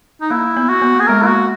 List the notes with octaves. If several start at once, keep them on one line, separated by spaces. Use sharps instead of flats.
D#4
A#3 E4
B3
F#4
B3
A#3 G#4
G#3 A#4
A#3 E4 F#4